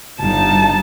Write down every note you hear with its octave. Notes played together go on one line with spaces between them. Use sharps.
G1 D#4 A5